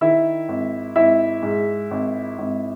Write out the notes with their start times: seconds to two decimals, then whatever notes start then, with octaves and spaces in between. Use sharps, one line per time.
0.01 D#3 E4 E5
0.49 G#1
0.96 G#1 E4 E5
1.43 G#2
1.91 G#1
2.38 G#1